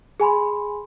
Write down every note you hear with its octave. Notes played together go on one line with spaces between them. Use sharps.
G#4 G#5 B5 C6